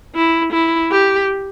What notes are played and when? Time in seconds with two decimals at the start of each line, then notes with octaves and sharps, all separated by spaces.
0.15 E4
0.53 E4
0.92 G4